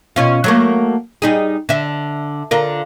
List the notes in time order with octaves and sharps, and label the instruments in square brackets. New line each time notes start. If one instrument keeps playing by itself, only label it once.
[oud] B2 C#4 F4
F#3 A3 A#3
G3 D#4 G#4
D3 E5
D3 F4 A#4